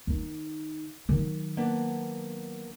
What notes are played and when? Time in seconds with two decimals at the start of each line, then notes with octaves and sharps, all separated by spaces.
0.07 D#3 D#4
1.09 D#3 F#3
1.57 A#3 B3 D4